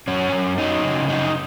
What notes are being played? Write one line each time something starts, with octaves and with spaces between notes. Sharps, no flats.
F#2 C#4
F#2
F#3 D#4
C#3
F#2 D#4